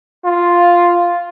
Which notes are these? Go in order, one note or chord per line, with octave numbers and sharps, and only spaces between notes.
F4